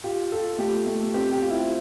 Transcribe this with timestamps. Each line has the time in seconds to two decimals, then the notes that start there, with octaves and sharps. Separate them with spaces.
0.04 F4 G4
0.32 F4 A4
0.58 A3 G4
0.86 A3
1.14 C4 G4
1.32 G4
1.42 F4
1.50 E4